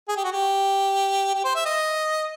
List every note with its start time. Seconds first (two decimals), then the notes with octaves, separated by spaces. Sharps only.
0.09 G#4
0.17 G4
0.24 F#4
0.32 G4
1.34 G4
1.44 C5
1.55 E5
1.65 D#5